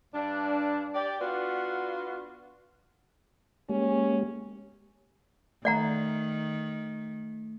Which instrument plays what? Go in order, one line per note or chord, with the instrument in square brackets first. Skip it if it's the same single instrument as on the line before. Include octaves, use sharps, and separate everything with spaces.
[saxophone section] G2 D4
G4 D5
B3 D4 F4 F#4 B4
[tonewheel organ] G#3 A#3 G4 [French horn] C#4
[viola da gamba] D#3 [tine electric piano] A3 [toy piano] D5 F#5 A#5